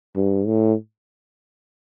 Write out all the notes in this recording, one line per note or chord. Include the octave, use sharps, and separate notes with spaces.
G2
A2